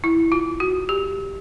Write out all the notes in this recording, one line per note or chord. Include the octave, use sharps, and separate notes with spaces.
E4
F4
F#4
G4